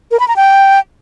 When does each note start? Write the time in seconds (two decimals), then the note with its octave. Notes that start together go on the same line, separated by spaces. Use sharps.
0.11 A#4
0.20 B5
0.28 A#5
0.36 G5